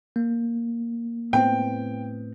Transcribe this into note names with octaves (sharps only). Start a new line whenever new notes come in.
A#3
A2 B3 C4 G5